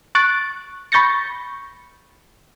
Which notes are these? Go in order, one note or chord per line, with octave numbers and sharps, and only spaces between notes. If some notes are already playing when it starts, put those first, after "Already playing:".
C#6 F#6 A6 D7
B5 C#6 G6 A6 A#6 C#7